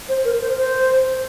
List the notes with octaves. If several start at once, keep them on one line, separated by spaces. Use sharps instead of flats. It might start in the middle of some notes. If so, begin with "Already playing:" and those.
C5
A#4
C5
C5